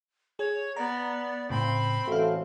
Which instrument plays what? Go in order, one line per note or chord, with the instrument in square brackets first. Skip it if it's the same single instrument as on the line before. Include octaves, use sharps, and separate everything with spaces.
[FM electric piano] G#4 [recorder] C#5
[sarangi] B3 [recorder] D5 [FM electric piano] A#5
[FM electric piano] A2 C#3 [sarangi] C4 [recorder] B5
[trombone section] A1 A3 [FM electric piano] F#4 F5